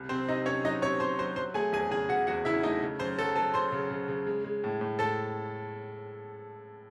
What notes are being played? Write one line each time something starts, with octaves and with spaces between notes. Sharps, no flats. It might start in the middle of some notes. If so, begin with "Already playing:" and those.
Already playing: C2
C3 C4 C5
C3 D#4 D#5
C3 C#4 C#5
F#3 D#4 D#5
C3 C#5 C#6
C3 C5 C6
F#3 C5 C6
F#3 C5 C6
A3 G#4 G#5
E2 G#4 G#5
C#3 G#4 G#5
C#3 F#4 F#5
E2 F#4 F#5
C#3 E4 E5
A3 D#4 D#5
C#3
F#2 C5 C6
F#3 A4 A5
F#3 A4 A5
F#2 C5 C6
C#3
C#3
C#3
G#3
G#3
A2
A2
A2 A4 A5